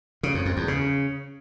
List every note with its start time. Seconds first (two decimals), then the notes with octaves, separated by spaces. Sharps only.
0.23 C#3
0.34 F2
0.46 F2
0.57 E2
0.68 C#3